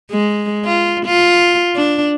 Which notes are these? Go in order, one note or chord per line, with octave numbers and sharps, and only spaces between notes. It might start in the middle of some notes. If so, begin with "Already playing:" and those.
G#3
F4
F4
D4